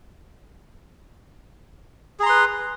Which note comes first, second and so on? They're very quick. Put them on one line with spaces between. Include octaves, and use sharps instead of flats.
G#4 A#5 C6 B4